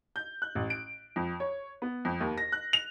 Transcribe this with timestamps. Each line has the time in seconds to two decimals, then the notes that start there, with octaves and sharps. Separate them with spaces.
0.16 G6
0.42 F#6
0.55 A1
0.70 D7
1.16 F2
1.40 C#5
1.82 B3
2.05 F2
2.20 D#2
2.38 A#6
2.52 F#6
2.73 F7